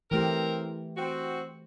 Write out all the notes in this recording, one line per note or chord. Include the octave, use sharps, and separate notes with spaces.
E3 A3 C4 G4 A#4
C4 F#4